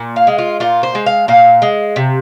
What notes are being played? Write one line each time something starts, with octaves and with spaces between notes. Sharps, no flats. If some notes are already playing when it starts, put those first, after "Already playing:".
Already playing: A#2
F5
G#3
F4
A#2 F4
C5
G#3
F5
A#2 F5
G#3
C3